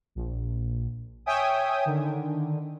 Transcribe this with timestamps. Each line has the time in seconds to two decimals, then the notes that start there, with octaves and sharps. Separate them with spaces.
0.15 A#1
1.26 C#5 E5 G5 G#5 D#6
1.86 D3 D#3